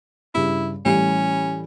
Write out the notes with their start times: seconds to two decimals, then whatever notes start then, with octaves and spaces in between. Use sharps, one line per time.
0.35 G2 C#3 E4
0.85 A2 E3 G3 C#4